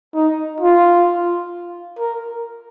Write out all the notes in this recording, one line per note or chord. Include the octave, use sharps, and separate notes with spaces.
D#4
F4
A#4